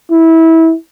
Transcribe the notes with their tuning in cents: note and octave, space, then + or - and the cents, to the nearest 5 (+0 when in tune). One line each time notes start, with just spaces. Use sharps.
E4 -20